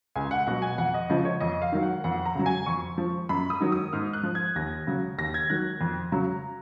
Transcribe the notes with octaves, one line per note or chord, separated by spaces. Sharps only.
C#2 G#5
F#5
B2 F#3 F#5
G#5
F2 F#5
D#5
C#3 F3 D#5
C#5
F2 D#5
F5
D#3 F#3
F#5
F2 F#5
A#5
C#3 F#3
G#5
F2 C#6
F3
F#2 B5
D#6
D#3 F#3
D#6
G#2 F6
F#6
F3
G#6
D#2 A#6
C#3 F#3
D#2 A#6
G#6
D#3 F#3 F#6
F2
C#3 F#3 A#5